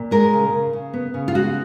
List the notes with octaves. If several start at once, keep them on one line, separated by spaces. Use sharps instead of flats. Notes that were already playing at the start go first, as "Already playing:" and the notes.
Already playing: A#2
G#3 A#4
C#3
C#3
C#3
B3
C#3
F4
G#3 F#4